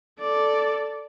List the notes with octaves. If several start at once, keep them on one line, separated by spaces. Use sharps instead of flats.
A4 D5